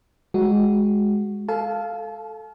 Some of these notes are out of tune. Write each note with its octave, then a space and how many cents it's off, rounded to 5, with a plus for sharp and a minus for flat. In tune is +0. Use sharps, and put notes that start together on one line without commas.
G#3 +0 F#4 +0
A4 +0 F5 +0 A5 -40